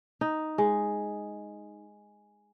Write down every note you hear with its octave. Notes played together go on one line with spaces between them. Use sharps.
D#4
G#3